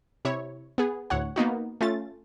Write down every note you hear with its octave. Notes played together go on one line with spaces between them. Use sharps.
C3 E4 C#5
B3 G#4
D2 A2 C#5 F#5
A#3 B3 D#4 F#4
A3 C#4 F4 A6